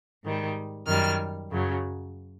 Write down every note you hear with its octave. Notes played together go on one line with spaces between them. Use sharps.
G#2 D#3 G3
F#2 D#3 G3 F6
F#2 C#3 F#3